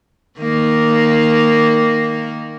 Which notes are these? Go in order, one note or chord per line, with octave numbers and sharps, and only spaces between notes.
D#3 A#3